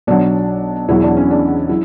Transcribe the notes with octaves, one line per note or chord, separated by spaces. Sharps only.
B1 B2 F#3 D4
E1 E2 B2 F#3 E4
D4
C#4
D4
F#3 E4